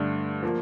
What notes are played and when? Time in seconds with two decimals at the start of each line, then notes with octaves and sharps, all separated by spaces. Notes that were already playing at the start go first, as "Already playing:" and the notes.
Already playing: G2 D3 A3 D4
0.43 F3 A#3